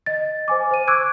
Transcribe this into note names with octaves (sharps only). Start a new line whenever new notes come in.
D#5 A6
C5 G#5 D6
C5 D#7
C#6 D6 E6 F#6 G#6 D7